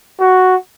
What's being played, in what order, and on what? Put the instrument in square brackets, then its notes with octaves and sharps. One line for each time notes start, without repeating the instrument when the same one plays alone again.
[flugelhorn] F#4